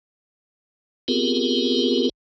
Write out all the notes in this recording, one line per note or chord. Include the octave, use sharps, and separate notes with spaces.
B3 C4 F4 G4 G#4 A#4